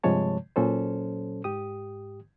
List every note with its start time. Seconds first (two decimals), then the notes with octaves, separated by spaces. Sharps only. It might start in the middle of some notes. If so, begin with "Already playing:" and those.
0.04 G2 C3 F3 G#3 C#5 A5
0.56 A#2 F#3 C#4 A4 C5
1.44 G#2 G4 D#6